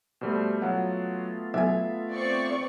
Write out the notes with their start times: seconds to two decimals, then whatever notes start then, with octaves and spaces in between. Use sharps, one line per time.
0.21 B2 G3 A3 C5
0.62 F#3 A3 B3 F4 F#5
1.54 B1 E5 G#5
2.12 C4 D5 C#6